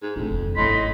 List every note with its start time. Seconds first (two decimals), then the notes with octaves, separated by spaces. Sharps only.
0.02 G#2
0.16 F2 A2 D4
0.29 F1 E2
0.56 G#1 A2 C#4 D#5 B5 C6